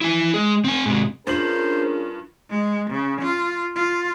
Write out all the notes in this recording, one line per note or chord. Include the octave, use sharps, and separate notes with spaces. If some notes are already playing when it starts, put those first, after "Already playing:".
E4 G#5
G#3 G#4
C4 G#5
G#2 C3
G2 C#4 F4 G#4 A#4 C5 F#7
G#3
C#3
F4
F4